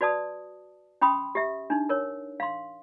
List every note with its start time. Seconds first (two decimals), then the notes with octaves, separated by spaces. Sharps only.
0.01 F#4 B4 D5 A5 D#6
1.01 C#4 G5 B5 C6 D#6
1.35 G4 E5
1.70 D4 D#4
1.89 A#4 C#5
2.40 F5 C6